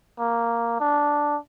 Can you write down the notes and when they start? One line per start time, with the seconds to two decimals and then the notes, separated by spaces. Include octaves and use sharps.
0.19 A#3
0.80 D4